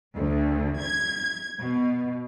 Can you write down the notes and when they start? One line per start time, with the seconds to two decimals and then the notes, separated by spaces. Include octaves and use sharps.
0.17 D2
0.82 G#6
1.60 B2